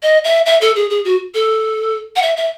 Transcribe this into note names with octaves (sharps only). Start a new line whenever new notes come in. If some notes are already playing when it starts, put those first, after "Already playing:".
D#5
E5
E5
A4
G#4
G#4
F#4
A4
F#5
E5
E5